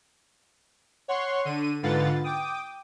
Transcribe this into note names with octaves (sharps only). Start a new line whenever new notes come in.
C#5 F#5 C6 C#6
D3 D#7
G#2 D3 F4 B4 F#5 A6
G5 D6 D#6